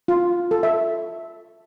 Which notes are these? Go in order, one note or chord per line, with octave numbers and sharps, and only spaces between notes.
F4
A4
E5